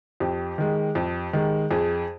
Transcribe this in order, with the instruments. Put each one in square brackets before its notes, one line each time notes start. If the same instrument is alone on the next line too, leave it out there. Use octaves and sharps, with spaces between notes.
[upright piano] F2 G4
D#3 G#3
F2
D#3 G#3
F2 G#4